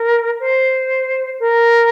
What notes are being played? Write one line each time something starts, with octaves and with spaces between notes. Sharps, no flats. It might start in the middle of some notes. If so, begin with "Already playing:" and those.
Already playing: A#4
C5
A#4